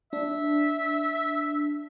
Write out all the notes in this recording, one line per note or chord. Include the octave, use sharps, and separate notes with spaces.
D4 E5